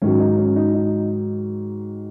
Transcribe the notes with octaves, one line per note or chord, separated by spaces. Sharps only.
G#2 D#3 F#3 C#4
D#4
C#4
D#4
D#4